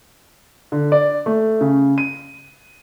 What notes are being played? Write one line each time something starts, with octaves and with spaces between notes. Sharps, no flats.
D3
D5
A3
C#3
D#7